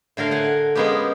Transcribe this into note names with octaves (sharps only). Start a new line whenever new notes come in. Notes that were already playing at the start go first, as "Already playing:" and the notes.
A2 D3 A#4 F5
F#5 G#5
G#3 A#3 B3 C#4 G4